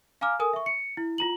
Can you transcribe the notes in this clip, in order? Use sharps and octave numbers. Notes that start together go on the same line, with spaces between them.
F5 G#5 A#5 D6 F6
A4 A#4 G#5 D#6
E5 C#6
C#7
E4
F4 A#5 F#7